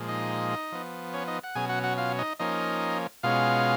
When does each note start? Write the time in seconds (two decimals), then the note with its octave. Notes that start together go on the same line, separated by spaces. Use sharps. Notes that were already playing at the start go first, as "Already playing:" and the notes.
Already playing: A#2 F3 G#3
0.09 D#4 D#5
0.72 F3 B3
1.14 C#4 C#5
1.28 D#4 D#5
1.44 F#5
1.55 B2 F#3 C#4 G#4 G#5
1.69 F#4 F#5
1.84 F#4 F#5
1.98 F4 F5
2.19 D#4 D#5
2.39 F3 A#3 C#4 D#4 D#5
3.23 B2 G#3 C#4 F4 F5